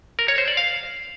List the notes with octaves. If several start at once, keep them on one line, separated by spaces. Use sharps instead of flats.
A#4
C#5
C5
D5
F5